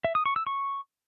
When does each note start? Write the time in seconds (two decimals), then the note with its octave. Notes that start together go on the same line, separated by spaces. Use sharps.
0.05 E5
0.15 D#6
0.26 C#6
0.36 E6
0.47 C#6